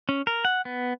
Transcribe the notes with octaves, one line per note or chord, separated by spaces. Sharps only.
C#4
A#4
F#5
B3